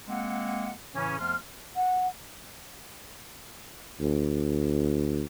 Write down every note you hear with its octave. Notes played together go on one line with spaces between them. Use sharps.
G#3 A#3 C4 F#5
A2 C#3 E3 C#4
F2 F3 A3 B3 C6 F6
F#5
D2